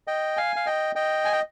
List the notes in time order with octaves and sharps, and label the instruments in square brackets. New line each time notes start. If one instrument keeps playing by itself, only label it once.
[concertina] D#5 G5
F5 G#5
F5
D#5 G5
D#5 G5
G#5
G5